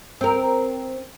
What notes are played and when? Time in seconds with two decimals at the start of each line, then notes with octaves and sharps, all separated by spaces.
0.21 C4 A#4